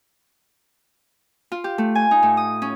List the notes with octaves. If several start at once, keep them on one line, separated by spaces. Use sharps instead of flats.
F4
G4
A3
G#5
D#4
A2
D#6
C#4